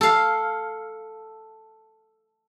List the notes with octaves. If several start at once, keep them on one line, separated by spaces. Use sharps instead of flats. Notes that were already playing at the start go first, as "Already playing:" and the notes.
A4 F5